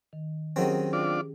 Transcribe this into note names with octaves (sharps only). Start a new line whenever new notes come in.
D#3
D#3 F#3 C4 C#4 G4 G#4
D4 F4 D5